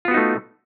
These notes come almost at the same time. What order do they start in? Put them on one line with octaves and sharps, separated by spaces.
F4 B3 F#4 D#4 A3